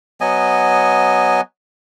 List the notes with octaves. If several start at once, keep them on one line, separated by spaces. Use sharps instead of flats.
F#3 B3 D#5 G#5